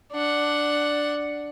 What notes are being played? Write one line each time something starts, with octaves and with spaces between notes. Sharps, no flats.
D4 F#5